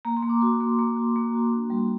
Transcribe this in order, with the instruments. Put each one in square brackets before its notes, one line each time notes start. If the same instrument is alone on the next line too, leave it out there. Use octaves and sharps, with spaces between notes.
[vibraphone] A#3 A#5
C6
A#3
D6
F#4 C6
A#3
A#3
F#4
A#3
F#4
D4
G3